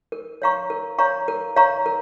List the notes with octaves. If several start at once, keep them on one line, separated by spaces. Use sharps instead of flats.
A#4
C#5 F5 A#5 C#6
A#4
C#5 F5 A#5 C#6
A#4
C#5 F5 A#5 C#6
A#4